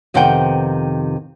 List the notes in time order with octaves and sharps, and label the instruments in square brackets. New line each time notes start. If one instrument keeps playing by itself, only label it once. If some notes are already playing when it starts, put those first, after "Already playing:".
[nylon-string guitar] F2 C3 D#3 B3 F#5 G5